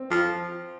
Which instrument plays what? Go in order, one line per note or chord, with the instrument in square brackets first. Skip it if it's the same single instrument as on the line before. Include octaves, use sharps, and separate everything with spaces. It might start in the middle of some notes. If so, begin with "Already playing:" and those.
Already playing: [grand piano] C4
[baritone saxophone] F3